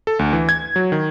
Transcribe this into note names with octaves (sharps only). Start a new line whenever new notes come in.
A4
D2
E3
G#6
F#3
D#3